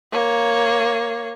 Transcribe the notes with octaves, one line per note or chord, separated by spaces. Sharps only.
A#3 C#5